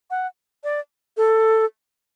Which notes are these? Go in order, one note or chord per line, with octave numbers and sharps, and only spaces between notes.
F#5
D5
A4